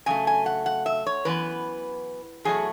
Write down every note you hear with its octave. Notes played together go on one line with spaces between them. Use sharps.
C#3 F#3 A3 G#5
G#5
F#5
F#5
E5
C#5
F#2 E3 B3 B4
E2 B2 F#3 A3 G#4